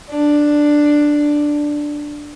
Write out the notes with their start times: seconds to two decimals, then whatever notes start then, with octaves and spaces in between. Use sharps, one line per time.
0.10 D4